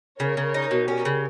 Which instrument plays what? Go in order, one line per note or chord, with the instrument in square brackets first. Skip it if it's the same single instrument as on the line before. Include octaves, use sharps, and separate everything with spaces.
[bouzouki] C#3 [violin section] A#4 C#5
[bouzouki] C#3
D#4
B2
[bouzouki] C#4 [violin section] G4 A#4
[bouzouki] C#3